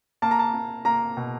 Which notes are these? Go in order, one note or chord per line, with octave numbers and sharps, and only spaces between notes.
A#3 A5
A#5
A5
A#3
A#3 A#5
B2